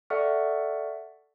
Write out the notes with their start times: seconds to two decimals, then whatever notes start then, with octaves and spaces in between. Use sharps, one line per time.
0.10 A4 D5 E5 F#5 C#6 F6